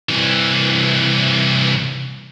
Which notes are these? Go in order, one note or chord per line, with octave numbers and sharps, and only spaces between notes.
C2 E3